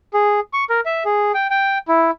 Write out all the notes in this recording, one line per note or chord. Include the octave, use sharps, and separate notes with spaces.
G#4
C#6
A#4
E5
G#4
G5
G5
E4